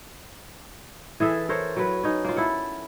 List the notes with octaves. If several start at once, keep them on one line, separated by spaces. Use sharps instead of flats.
E3 G#4 A4 E5
A4 A#4 C5 C#5
F#3 B4
C#4 D#4
A#3 F4
E4 A4 F#5